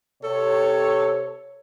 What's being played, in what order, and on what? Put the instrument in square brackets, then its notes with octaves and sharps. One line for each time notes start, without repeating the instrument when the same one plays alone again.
[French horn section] C3 C#5 [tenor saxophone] A4